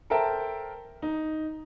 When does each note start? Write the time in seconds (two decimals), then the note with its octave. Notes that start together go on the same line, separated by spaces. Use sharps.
0.10 A4 A#4 C5 E5 G5 A5
1.02 D#4